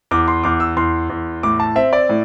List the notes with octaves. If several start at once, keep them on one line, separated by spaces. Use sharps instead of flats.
E2 D6
C6
E2 D6
E6
E2 C6
E2
A2 D6
A5
C4 E5
D5
A2